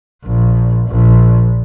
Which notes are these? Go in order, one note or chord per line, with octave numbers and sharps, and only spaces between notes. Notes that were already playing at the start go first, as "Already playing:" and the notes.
A#1
A#1